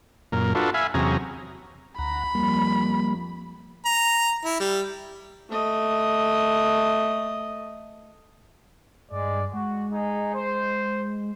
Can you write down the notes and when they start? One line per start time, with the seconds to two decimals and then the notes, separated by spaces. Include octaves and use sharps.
0.32 F#2 A#2 A#4
0.55 D4 F4 F#4 A4 B4
0.74 E5 F5 G#5 B5
0.94 E2 C3 F#3 C#4 G#4 A#5
1.99 D2 F#5 A#5 B5
2.35 F2 G3 A#3
3.86 A#5
4.45 E4
4.60 G3
5.50 A3 D#5
9.11 G2 G#3 D5
9.54 G#3 F#4
9.91 D#4 G#4
10.35 C5